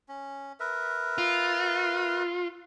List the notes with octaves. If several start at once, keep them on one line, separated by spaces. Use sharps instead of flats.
C#4
A#4 B4 E5
F4